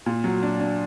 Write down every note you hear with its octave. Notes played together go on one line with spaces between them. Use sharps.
A#2
F#3
D4
D4